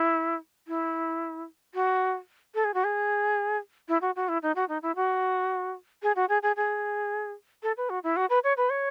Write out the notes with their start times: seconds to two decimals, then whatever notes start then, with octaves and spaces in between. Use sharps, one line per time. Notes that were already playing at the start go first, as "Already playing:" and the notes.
Already playing: E4
0.68 E4
1.74 F#4
2.55 A4
2.64 G#4
2.74 F#4
2.84 G#4
3.88 E4
4.01 F#4
4.16 F#4
4.28 E4
4.42 D#4
4.55 F#4
4.69 D#4
4.82 E4
4.96 F#4
6.02 G#4
6.16 F#4
6.29 G#4
6.43 G#4
6.56 G#4
7.63 A4
7.77 B4
7.89 F#4
8.03 E4
8.16 F#4
8.30 B4
8.44 C#5
8.57 B4
8.70 C#5